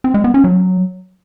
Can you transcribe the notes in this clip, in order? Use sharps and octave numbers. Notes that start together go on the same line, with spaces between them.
C4
G#3
B3
C#4
F#3